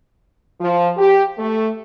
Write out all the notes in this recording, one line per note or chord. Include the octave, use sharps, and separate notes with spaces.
F3
G4
A3